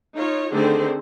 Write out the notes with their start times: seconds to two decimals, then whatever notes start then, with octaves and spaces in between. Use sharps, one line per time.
0.15 D#4 F4 C#5
0.53 D3 D#3 A3 C4 G#4 C5